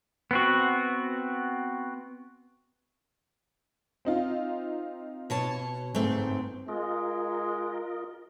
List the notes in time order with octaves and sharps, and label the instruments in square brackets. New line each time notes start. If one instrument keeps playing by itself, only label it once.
[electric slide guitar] B3 C4 F#4
[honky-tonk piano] C4 D#4 F4
[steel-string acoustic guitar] B2 C#5 A5
[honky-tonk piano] G1 A3 [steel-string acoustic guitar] G#2 C4
[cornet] G#3 [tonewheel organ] F4 A#4 D#5